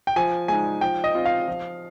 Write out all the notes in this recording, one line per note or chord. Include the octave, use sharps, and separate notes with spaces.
G5
F3 G#5
G#3 D#4 G#5
F3 G5
D#5
C4 F4
F5
F3